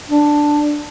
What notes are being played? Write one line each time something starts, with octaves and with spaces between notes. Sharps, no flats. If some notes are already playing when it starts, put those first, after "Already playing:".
D4